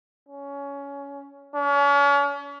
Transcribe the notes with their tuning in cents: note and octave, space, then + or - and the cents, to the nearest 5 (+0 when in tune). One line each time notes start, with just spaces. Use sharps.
C#4 +20
C#4 +40